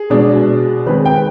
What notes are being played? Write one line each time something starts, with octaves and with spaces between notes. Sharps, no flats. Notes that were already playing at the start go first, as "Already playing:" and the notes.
Already playing: G#4
B2 G#3 D4
D#3 G#3 C4 B4
G5